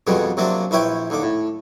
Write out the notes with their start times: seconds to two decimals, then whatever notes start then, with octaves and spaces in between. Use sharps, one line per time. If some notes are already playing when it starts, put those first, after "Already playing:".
0.07 F2 B2 D3 G3 G#3
0.37 C3 F#3 A#3 C4 D4
0.71 A#1 E4 B4 C#5 G5
1.10 D#2 D3 D6
1.22 A2